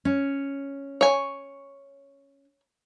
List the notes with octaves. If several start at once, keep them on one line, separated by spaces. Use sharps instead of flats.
C#4
C#5 G#5